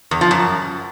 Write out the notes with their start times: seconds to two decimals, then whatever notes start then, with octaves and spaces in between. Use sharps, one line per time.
0.11 E2
0.21 F3
0.31 F#2